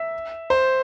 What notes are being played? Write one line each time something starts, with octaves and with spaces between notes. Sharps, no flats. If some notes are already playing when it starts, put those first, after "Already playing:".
Already playing: E5
C5